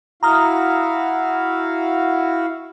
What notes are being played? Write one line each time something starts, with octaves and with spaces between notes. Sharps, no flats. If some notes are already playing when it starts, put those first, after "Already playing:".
E4 F#4 F5 A#5 D#6 F6